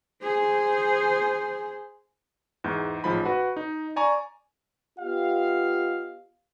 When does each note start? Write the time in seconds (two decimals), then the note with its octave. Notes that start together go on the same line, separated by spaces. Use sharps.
0.23 G#4 C5
2.64 E2 G#2 G6
3.04 A1 G#2 F3 B5
3.25 F#4 B4
3.57 D#4
3.96 D5 G#5 A#5 C#6
4.99 B3 F4 G4 D#5 F5